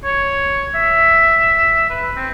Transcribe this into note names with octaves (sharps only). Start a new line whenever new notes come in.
C#5
E5
B4
C4